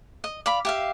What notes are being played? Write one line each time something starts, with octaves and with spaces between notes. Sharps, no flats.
D#5
D5 F5 B5
G4 E5 F5